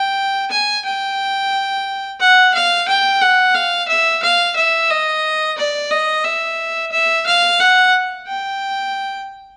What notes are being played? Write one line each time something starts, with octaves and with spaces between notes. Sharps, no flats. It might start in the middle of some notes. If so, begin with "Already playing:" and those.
Already playing: G5
G#5
G5
F#5
F5
G5
F#5
F5
E5
F5
E5
D#5
D5
D#5
E5
E5
F5
F#5
G5